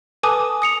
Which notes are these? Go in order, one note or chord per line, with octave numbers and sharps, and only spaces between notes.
A4 B4 G#5 A5 D6 D#6
D#6 C#7 F7